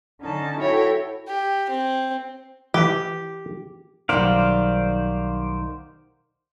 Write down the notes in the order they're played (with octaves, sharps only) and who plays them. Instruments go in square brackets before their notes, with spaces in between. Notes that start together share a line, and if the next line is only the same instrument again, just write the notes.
[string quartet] D3 C#4 D#4 A5
E4 F#4 A4 C#5 G5
[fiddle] G4
C4
[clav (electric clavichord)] E3 B4 [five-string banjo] G4
[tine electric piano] B1 F#5 A#5 [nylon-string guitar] D#3 G3 [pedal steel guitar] C5 D5 F5